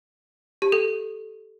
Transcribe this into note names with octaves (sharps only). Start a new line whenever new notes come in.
G4
A4